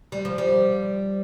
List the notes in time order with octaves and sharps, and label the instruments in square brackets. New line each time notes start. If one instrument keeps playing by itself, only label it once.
[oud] G3
F3
G3